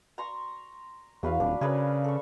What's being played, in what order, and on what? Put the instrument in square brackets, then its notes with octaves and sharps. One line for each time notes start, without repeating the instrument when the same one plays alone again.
[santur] A#5 C6 C#6
[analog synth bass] E2 [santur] F#3 B4 F5
[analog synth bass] D#1 [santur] D4
[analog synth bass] C#3 [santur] G#4 A#4 B4
[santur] A4 C#6